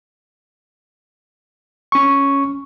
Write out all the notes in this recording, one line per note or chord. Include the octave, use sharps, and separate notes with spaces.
C#4 C#6